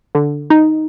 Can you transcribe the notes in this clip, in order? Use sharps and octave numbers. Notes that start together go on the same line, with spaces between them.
D3
D#4